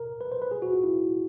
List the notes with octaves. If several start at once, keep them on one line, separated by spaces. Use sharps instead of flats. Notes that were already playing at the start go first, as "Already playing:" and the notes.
Already playing: A#4
B4
C5
B4
G#4
F#4
F4
E4